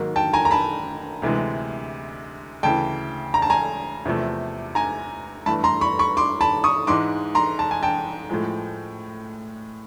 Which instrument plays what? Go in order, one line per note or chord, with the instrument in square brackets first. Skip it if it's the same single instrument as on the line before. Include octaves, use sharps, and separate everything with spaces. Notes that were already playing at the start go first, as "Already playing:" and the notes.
Already playing: [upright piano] G#2 D#3 F#3 A#3
G5 A5
G#5 A#5
A#5
A5 B5
D2 C3 E3 G#3
D2 C#3 E3 G5 A5
A#5
A5
G#5 A#5
E2 C3 F3 A3
G#5 A#5
G2 E3 A3 A5 B5
A#5 C6
B5 C#6
B5 C#6
C6 D6
A5 B5
C#6 D#6
G#2 E3 G#3 C6 D6
A#5 C6
A5
G#5
G5 A5
A2 F3 G#3